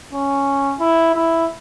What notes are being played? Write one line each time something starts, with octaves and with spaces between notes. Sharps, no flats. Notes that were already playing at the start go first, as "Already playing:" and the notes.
C#4
E4
E4